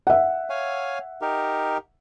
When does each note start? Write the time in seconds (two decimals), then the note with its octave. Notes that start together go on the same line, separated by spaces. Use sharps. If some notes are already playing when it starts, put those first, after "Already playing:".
0.07 E5 F#5
0.50 C#5 F5 G#5
1.22 D#4 G4 A#4